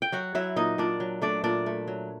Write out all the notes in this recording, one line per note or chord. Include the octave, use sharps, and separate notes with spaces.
G5
F#3 F#4 F#5
F#3 E4 E5
A#2 D#4 D#5
A#2 D4 D5
F#3
A3 D4 D5
A#2 D4 D5
A3
F#3